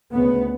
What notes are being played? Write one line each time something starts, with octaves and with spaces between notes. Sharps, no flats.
D2 C#3 B3